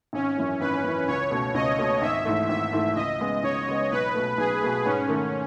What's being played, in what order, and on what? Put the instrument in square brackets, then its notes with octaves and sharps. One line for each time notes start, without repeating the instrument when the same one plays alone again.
[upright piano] G#1 [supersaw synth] C#4
[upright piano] F#2 E3
[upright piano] G#1 [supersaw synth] B4
[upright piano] F#2 E3
[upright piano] C#2 [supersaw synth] C#5
[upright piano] B2 A3 C#4
[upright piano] C#2 [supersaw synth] D#5
[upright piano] B2 A3 C#4
[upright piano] G#1 [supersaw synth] E5
[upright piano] G#2 E3 A3
[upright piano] G#1 [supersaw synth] E5
[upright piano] G#2 E3 A3
[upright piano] C#2 [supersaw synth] D#5
[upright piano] C#3 G#3 B3
[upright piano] C#2 [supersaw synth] C#5
[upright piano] C#3 G#3 B3
[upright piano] B1 [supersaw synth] B4
[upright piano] B2 A3
[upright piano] B1 [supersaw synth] G#4
[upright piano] B2 A3
[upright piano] G#2 [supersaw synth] C#4
[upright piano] D#3 A3